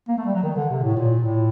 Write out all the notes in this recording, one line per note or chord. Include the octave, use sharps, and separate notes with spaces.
A#3
A3
G3
F#3
D#3
D3
C3
A2
A#2
A2